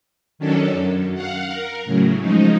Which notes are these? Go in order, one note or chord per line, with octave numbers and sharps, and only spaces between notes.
D#3 F#3 C#4 D4 A4
F#2
F5 F#5
A#4
A2 C#3 F#3
C#3 F3 G#3 D#4